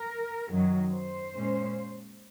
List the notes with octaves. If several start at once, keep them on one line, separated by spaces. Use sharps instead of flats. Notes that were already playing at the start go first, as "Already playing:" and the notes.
Already playing: A#4
F#2 D#3 F#3
C5
A#2 G#3 C#4